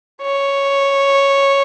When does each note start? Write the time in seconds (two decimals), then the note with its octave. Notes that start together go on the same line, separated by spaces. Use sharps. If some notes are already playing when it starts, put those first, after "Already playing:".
0.22 C#5